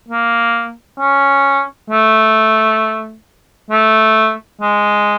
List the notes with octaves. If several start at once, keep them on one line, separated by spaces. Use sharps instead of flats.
A#3
C#4
A3
A3
G#3